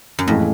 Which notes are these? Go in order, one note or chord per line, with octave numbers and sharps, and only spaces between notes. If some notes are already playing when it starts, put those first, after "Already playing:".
F#2
F2 A2 E3 G#3